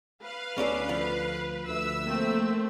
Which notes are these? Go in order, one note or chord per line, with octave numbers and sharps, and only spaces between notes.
B4 F5
D2 C#4 D4 A4
F3
D2 E5 E6
A3 A#3 C4